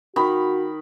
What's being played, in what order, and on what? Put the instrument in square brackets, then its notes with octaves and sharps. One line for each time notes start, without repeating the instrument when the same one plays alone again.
[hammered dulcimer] D#3 [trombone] F#4 [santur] B5